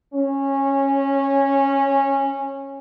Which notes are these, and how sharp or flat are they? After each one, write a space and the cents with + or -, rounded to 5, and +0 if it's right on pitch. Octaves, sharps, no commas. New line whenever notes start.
C#4 -15